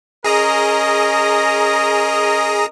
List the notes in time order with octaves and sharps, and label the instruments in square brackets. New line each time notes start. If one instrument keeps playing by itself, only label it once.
[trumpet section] C#4 A#4 D#5 [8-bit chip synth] G#4 A#5 D#6